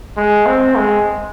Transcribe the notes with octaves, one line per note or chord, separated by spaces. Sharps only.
G#3
C4
G#3